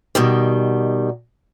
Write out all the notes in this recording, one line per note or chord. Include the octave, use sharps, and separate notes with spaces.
B2 D#3 G3